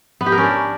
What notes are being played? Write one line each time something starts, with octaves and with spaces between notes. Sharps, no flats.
B3
G4
A#4
C#4
D4